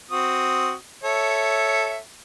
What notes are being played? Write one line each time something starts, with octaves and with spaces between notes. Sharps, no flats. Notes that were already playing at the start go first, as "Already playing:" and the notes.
C4 F#4 D#6
A4 C#5 E5